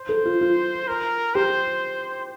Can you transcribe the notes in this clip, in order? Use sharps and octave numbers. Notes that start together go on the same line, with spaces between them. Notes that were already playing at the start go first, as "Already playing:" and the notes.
Already playing: C5
A4
F4
F4
A#4
G4 C5